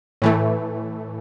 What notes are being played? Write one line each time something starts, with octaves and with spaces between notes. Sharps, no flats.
A2 E3 A3